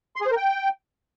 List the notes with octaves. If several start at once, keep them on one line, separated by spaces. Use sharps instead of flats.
C6
G#4
C5
A#4
G5